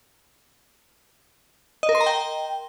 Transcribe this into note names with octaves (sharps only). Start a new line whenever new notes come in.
D#5
A#4
C6
A#5
G5